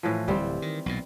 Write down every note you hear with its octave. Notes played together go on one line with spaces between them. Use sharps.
A2 E3 F3
D1 G3 C4
D#3
B1 A#2